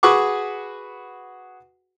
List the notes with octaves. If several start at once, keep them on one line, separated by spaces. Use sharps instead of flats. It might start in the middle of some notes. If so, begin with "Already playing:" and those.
F#4 G#4 B4 F#5 C#6 D6